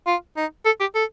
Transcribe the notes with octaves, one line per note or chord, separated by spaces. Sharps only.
F4
D#4
A4
G4
A4